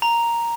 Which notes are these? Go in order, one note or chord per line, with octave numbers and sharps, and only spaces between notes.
A#5